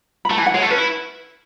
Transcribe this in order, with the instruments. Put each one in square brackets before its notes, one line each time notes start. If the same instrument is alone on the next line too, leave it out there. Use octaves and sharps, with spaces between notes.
[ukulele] B5
[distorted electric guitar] A3 [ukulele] A5
[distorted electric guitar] E3 [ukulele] G#5
[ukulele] F#5
[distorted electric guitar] G#3 [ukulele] C#5
[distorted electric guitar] A3 [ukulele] A4
[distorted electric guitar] C#4 [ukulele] B4
[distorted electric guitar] E4